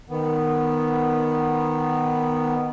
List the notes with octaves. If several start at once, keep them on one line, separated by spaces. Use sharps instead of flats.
D#3 B3